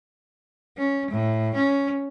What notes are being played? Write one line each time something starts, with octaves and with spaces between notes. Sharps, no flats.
C#4
A2
C#4